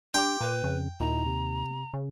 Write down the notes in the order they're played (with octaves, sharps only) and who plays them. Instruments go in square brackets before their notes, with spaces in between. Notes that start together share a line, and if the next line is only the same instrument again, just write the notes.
[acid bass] D4 [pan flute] G4 [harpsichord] G5 [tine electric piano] C6 D6
[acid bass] A#2 [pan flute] B4
[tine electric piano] F2 [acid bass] C#3
[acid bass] D#2 [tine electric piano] A#2 D#4 E4 [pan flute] A#5
[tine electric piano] C3
[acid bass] C#3